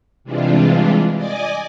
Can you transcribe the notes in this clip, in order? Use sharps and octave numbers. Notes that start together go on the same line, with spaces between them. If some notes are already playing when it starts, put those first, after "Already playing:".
C3 E3 G3 G#3 D4 F4
D5 D#5 G#5 D6